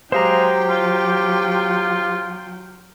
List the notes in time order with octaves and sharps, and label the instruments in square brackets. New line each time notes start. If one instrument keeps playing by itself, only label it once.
[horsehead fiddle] F#3 G5 [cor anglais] G#3 [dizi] G4 [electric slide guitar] C5 F5 A#5
[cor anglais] F4